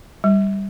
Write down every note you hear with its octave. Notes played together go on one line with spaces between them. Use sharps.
G3